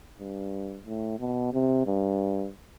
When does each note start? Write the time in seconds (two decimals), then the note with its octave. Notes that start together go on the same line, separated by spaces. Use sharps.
0.19 G2
0.86 A2
1.19 B2
1.53 C3
1.87 G2